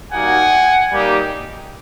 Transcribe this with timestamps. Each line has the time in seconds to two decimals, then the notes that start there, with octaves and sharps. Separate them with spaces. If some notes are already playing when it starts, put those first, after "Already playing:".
0.12 G3 A#3 D#4 F#4 F#5 G#5
0.91 G3 A#3 D#4 G4